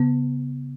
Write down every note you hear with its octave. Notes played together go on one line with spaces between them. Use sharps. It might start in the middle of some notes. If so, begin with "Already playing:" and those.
Already playing: C#3 B3